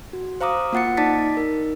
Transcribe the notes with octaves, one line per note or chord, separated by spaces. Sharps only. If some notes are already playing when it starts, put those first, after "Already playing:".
F#4
C5 F5 A#5 D6 D#6
A#3 F4 F#5 A6 C#7
D#4 D5 A5 D6 A6 B6
D#4 A#4